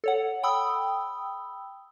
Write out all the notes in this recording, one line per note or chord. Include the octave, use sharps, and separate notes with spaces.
A4 C#5 F#5
G5 B5 D#6 E6